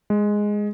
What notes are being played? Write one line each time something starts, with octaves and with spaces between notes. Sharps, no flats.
G#3